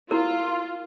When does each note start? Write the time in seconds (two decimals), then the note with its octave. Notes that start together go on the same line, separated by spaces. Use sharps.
0.11 E4 F4 A#4